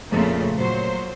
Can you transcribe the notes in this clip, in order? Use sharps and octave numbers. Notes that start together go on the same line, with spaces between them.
F2 A#2 C#3 A3
A#2 F#3 C5